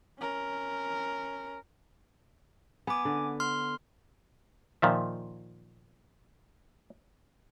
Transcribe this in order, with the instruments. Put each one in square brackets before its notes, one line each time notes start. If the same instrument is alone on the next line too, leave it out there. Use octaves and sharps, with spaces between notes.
[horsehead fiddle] C#4 A#4
[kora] B3 [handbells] G#5 D6
[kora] D3
[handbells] C6 F6
[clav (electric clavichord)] A#2 D#3 F3 E5